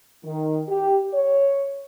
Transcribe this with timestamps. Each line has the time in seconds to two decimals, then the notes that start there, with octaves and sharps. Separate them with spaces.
0.25 D#3
0.68 G4
1.14 C#5